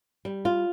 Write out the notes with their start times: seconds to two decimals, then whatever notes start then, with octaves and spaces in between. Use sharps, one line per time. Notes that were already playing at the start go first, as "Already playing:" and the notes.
0.25 G3
0.45 F4